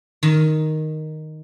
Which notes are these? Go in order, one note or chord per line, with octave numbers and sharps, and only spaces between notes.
D#3